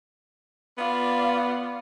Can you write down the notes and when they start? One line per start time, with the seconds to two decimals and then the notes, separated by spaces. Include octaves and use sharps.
0.78 B3 F4 D5